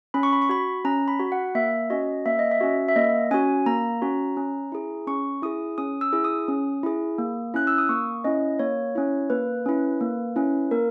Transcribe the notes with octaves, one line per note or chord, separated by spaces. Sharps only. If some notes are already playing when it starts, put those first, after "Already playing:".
C#4 B5
C#6
B5
C#6
F#4 B5
C#4 A#5
B5
F#4
F#5
A#3 E5
C#4 F#4 D#5
A#3 E5
D#5
E5
C#4 F#4
E5
A#3 D#5
C#4 F#4 G#5
A#3 A#5
C#4 F#4
C#4
E4 G#4
C#4 C#6
E4 G#4 D#6
C#4 D#6
E6
E4 G#4
D#6
C#4
E4 G#4
A#3
C#4 E4 F#6
E6
D#6
A#3 C#6
C#4 E4 D#5
A#3 C#5
C#4 E4
A#3 B4
C#4 E4
A#3
C#4 E4
A#3 A#4